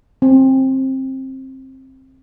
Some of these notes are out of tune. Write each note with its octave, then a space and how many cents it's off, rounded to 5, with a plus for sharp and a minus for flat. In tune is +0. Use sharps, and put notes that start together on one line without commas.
C4 +20